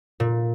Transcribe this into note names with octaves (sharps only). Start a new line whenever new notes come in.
A#2